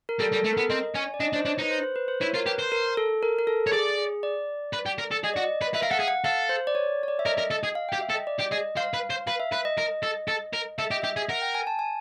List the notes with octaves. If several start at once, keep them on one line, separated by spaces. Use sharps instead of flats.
A#4
G3 A4
G3
A4
A3
B3 A#4
C4 D#5
C#4 G#5
D5
D4 D#5
D4 C5
D4 C#5
D#4 B4
C5
C5
B4
C5
E4 C#5
F4 A#4
G4 B4
C5
A#4
A4
A#4
A#4
A4
C#5
G#4 D5
G#4
D5
B4
G4
A#4
A4
G#4 D#5
F#4 D5
D#5
B4
B4 E5
A#4 F5
A4 F#5
G#4
F#5
A4 F5
C5
D5
C#5
C#5
D5
E5
A#4 D#5
A#4
A4 D#5
G#4
F5
G4 G5
E5
A4
D#5
D5
G4
G#4 D#5
C5 F5
B4
C5
B4 F5
E5
B4
D#5
A#4
A4
A4
A#4
A4 E5
G4 D#5
G4 E5
G#4
A#4 F#5
G5
G#5
A5
G#5